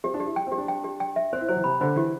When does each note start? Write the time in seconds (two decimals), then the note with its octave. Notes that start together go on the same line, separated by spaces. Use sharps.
0.04 C4 G4
0.14 D4
0.20 G4
0.26 E4
0.36 G5
0.47 C4
0.52 G4
0.58 D4
0.68 G5
0.84 G4
1.00 G5
1.16 E5
1.33 C4 C5
1.41 E4
1.49 F#3 C5
1.57 E3
1.64 C3 B5
1.81 D3 C5
1.96 E3 G4